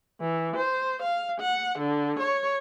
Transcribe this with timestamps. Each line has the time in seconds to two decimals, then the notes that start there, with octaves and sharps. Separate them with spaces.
0.21 E3
0.56 C5
1.02 F5
1.40 F#5
1.79 D3
2.19 C#5